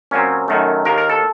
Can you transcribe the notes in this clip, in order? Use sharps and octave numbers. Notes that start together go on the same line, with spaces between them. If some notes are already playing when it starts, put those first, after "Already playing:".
A#2 F#3 C4 C#4
F#2 D#3 F#3 A3
D#2 D#3 A#3 A#4
A#4
A4